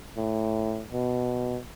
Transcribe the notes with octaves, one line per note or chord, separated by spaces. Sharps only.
A2
B2